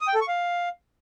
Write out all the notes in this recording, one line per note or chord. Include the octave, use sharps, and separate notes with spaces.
D#6
G5
A4
C#6
F5